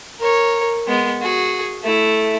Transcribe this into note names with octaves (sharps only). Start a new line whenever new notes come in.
A#4 C#5
G#3 B3
F#4 G#4
A3 E4